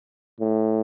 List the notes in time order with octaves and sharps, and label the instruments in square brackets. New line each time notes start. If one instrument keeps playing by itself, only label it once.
[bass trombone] A2